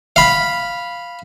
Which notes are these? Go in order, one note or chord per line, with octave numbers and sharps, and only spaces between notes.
F5 B5